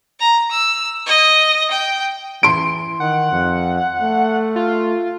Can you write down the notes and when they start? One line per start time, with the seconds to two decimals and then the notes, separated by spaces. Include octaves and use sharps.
0.20 A#5
0.51 E6
1.06 D#5
1.71 G5
2.43 E3 C6 D7
3.00 D#3 F#5
3.32 F2
4.02 A3
4.56 F4